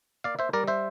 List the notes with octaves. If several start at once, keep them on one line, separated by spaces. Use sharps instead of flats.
A#3 D5 F5
C5 E5
G3 A#4 D5
C5 E5